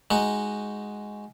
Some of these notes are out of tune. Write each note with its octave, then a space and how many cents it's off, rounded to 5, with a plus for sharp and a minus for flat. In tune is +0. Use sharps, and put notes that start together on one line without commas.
G#3 +0 D#4 +0 F#4 +0